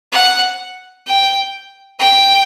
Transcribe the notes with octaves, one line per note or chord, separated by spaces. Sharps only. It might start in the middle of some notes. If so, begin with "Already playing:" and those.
F#5
G5
G5